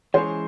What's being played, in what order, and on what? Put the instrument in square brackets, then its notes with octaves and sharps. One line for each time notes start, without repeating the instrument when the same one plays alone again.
[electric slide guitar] E3 G#3 C#4 G#4 C#5 [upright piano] C5